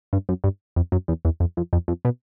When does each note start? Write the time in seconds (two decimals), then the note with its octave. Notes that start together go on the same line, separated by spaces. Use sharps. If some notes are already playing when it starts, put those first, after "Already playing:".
0.13 G2
0.29 F#2
0.44 G2
0.76 F2
0.92 F#2
1.08 E2
1.25 E2
1.40 F2
1.57 F2
1.73 F2
1.88 F2
2.05 B2